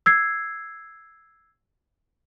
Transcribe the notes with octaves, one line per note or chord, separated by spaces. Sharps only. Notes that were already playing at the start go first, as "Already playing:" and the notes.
E6 G#6 C7